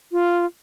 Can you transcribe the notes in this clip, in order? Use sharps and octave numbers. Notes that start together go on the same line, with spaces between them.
F4